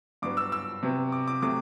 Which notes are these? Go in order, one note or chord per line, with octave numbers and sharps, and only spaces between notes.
G2 F#3 B3 D6
E6
E6
C3 F#3 B3
D6
D6
C3 F#3 A3 D6